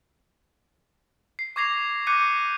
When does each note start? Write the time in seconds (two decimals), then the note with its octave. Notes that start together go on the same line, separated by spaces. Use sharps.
1.39 C7
1.56 C#6 D6 G#6 A#6 C7 F7
2.07 D6 F#6 G6 A#6 C#7 D#7